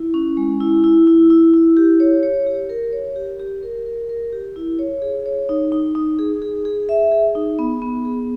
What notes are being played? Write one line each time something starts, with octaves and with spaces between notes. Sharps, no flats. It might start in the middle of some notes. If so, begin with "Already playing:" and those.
Already playing: E4
C#4
G#3
E4
E4
E4
E4
E4
G4
C#5
C#5
G4
A#4
C#5
G4
G4
A#4
A#4
A#4
G4
E4
C#5
G#4
C#5
D#4
D#4
D#4
G#4
G#4
G#4
E5
G#4
D#4
B3
B3
G#4